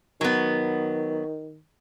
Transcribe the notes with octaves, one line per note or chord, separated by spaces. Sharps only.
D#3 F#3 B3